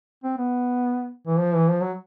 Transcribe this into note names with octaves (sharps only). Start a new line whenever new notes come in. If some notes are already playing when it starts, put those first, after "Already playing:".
C4
B3
E3
F3
E3
F3
F#3